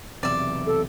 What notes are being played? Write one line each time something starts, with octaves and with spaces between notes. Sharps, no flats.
B1 E2 C3 D5 E5
A4